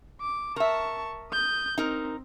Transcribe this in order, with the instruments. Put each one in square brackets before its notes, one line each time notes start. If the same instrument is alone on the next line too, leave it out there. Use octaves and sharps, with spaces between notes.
[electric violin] D6
[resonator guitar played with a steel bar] A#4 E5 [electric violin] A5 C#6
[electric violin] D#6 G6
[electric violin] C4 [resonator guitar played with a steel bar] D#4 A#4